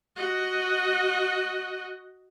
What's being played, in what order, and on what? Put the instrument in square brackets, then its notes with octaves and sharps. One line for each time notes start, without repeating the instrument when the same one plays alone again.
[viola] F#4 D#5